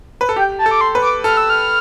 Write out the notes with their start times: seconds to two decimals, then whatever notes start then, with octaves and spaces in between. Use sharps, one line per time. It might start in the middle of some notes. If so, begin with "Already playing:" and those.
0.21 B4
0.29 A4
0.36 G4 G5
0.59 A5
0.66 A4
0.71 D6
0.81 C6
0.95 B4
1.02 D6
1.24 A4 F6
1.37 E6
1.50 F6